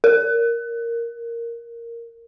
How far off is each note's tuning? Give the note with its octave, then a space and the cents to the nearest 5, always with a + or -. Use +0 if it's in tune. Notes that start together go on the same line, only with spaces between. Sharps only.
A#4 +0